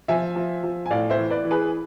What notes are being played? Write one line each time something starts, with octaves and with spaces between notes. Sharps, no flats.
F3 E5 G#5
F3
F3
G#5
A2 D5 F5
C5 E5
E3
B4 D5
E3
G#4 B4